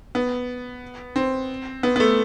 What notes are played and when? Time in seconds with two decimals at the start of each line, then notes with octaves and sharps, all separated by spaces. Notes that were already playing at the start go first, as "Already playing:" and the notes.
0.15 B3
1.16 C4
1.83 B3
1.96 B3
2.00 A3